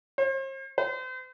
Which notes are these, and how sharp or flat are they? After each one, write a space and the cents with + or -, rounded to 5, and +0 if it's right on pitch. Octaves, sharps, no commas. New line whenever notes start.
C5 +45
C5 -35